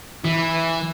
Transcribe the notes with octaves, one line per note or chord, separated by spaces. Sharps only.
E3